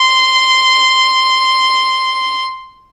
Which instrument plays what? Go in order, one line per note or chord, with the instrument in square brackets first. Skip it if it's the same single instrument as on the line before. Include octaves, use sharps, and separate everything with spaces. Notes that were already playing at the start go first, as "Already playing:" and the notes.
Already playing: [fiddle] C6